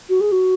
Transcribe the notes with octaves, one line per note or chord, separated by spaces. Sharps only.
F#4
G#4
F#4